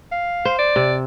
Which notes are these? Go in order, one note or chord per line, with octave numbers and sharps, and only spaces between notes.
F5
C5
D5
C3